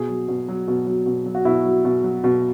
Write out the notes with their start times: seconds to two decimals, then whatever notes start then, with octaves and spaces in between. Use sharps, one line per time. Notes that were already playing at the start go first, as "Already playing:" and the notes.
Already playing: B2 G#4
0.09 F#3
0.28 B2
0.48 F#3
0.68 B2
0.87 F#3
1.06 B2
1.26 F#3
1.35 F#4
1.45 B2 E4
1.65 F#3
1.85 B2
2.04 F#3
2.24 B2